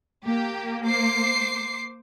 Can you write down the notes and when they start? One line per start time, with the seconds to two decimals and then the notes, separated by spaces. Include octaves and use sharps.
0.24 A#3 G4
0.85 C5 D6 C7